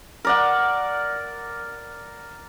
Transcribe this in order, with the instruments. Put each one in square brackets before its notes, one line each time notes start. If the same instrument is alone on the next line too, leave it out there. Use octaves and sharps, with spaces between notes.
[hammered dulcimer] A#4 D5 F#5